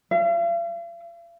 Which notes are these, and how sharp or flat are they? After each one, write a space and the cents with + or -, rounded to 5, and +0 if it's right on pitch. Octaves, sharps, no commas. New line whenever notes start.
F5 -45